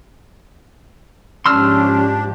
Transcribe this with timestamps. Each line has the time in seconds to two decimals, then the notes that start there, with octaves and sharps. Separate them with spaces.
1.46 G#2 F3 C#4 D4 G4 C6 E6 F6